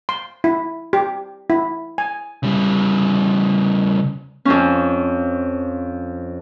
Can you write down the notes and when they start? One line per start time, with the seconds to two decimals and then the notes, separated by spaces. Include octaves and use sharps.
0.09 C6
0.44 E4
0.93 G4
1.50 E4
1.98 G#5
2.43 C#3 G3
4.45 F2 F3 C#4